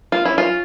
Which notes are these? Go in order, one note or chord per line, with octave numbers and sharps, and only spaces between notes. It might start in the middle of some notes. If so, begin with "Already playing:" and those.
A#3 F4
C#4 E4
F#3 F4